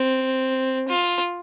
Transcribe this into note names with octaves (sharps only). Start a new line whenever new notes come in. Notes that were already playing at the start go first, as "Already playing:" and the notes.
Already playing: C4
F4